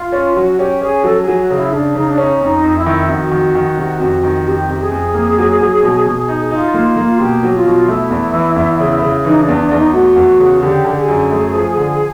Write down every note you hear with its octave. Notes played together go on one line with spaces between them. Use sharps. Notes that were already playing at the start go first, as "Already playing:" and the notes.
Already playing: F4
C#4
F#3 F#4
C#4 G4
C#4 G#4
F#3 A4
G#4
F#3
F#4
C#3
E4
C#3 D4
C#3 D#4
D4
C#4 D#4
F2 D#4
F2
E4
D#3
F2 F#4
D#3
D#3
C3
F2
D#3
F2 G4
C3
G#4
F2
A#3
F#3
F#3
B2
B2
D#4
D#4 F4
F4
A#3
F4
A#3
F4
B2 G4
F#3
F4
B2
A3 E4
E2
E3
E2
C#3
C#3
E3 D#4
D4
E2
D4
E2
D#4
A3 F#4
E2
C#3
D3 G4
D3 A4
G#4
F#2
A3
F3
D3